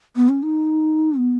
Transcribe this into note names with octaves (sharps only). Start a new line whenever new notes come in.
B3
C#4
D#4
B3